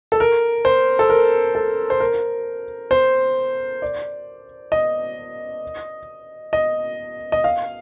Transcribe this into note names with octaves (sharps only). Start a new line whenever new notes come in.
A4
A#4
C5
A4
A#4
A4
C5
A#4
C5
D5
D#5
D#5
D#5
F5